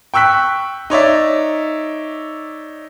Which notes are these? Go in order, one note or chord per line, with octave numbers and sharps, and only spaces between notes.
G5 C#6 E6 F#6 B6
D#4 C#5 D5 E5